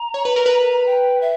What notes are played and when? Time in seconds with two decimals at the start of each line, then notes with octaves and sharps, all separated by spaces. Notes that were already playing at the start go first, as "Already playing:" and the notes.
Already playing: A#5
0.14 C#5
0.25 B4
0.36 A#4
0.46 B4
0.86 G5
1.21 E5